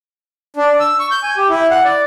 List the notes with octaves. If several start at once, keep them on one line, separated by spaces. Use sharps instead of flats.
D4
E6
C#6
G6
G#5
G4
E4
F#5
D5